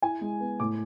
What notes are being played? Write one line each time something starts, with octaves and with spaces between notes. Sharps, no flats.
E4 G#5
G#3
B3
A2 D6